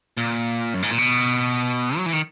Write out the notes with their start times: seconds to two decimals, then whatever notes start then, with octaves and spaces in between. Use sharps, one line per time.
0.17 A#2
0.74 F#2
0.82 G#2
0.91 A#2
0.98 B2
1.97 F#3
2.06 E3
2.13 D#3